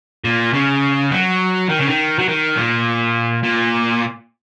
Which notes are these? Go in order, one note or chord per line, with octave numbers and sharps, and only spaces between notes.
A#2
C#3
F#3
D#3
C#3
D#3
F#3
D#3
A#2
A#2